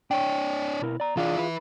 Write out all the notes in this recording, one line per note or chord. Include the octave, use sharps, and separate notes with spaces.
D4 C#5 G5
B2 E4 A#4
D5 A#5
E3 D4 F4 G#4 F5
E4 B4